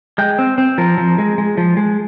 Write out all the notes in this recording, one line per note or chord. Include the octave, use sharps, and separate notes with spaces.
G#3 G5
C4
C4
F3 A#4
F3
G#3
G#3
F3
G#3